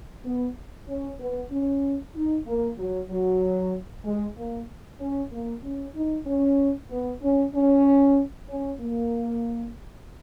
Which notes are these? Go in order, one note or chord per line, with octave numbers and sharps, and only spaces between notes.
B3
C#4
B3
C#4
D#4
A#3
F#3
F#3
G#3
A#3
C#4
A#3
C#4
D#4
C#4
B3
C#4
C#4
C#4
A#3